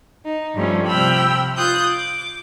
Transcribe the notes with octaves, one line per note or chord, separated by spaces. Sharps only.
D#4
G2 F3 G3 A3 C#4
C3 F3 G5 B5 E6 F6
F4 D#6 F#6 G6
D6